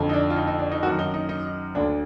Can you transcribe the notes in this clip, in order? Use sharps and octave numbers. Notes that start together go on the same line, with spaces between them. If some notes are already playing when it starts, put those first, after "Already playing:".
Already playing: F2 D3
D#4
D4
F4
D#4
D#4
D4
D#4
F#2 D#3 F#4
D#4
D#4
D#4
D2 D3 D4